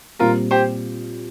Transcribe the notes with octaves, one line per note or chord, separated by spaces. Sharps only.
A#2 G3 C4 F4 A#4
G4 C5